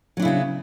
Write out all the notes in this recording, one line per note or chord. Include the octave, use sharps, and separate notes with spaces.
C#3 F#3 B3 D4 E4